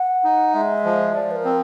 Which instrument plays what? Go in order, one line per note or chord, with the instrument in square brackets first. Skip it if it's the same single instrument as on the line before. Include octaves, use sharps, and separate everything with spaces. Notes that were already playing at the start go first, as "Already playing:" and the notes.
Already playing: [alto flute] F#5
[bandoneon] D#4
[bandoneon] G#3 [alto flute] E5
[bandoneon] F3
[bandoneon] F3 [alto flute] D5
[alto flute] B4
A#4
[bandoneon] C4